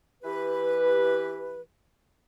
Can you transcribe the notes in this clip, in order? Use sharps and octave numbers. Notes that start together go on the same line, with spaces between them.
E3 G4 B4